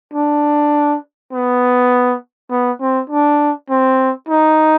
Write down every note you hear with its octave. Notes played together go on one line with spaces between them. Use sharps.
D4
B3
B3
C4
D4
C4
D#4